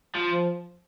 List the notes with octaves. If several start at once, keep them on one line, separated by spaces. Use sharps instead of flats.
F3
F3